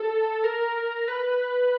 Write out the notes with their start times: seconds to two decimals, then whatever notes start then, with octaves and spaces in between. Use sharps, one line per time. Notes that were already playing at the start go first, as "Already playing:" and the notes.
Already playing: A4
0.44 A#4
1.08 B4